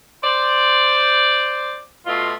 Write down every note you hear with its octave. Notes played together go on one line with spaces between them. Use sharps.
C5 D5
B2 A3 F4